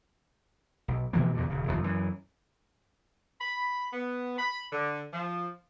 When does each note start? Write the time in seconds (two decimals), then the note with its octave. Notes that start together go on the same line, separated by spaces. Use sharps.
0.88 B1
1.13 B2 E3 F3 A#3
1.34 E2 G2 B2 D3
1.50 D#1 C#3
1.67 F1 D#2 A#2 F3
1.84 F#2 E3
3.40 B5
3.93 B3
4.38 B5
4.72 D3
5.13 F3